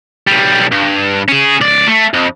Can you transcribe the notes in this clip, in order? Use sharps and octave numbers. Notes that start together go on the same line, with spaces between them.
B1 G3
G2
C#4 G#4
C#2 D5
A3
F2